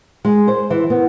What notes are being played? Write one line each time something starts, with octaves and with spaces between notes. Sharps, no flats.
G#3
C5
E3
B3